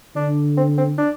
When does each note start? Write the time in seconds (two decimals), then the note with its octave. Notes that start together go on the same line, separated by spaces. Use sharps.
0.15 D3 D4
0.57 C4
0.78 C4
0.98 D4